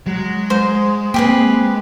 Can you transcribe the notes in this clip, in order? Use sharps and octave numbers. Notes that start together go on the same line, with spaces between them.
F#3 G#3
G#2 C5
A#3 C4 G4 G#4 B4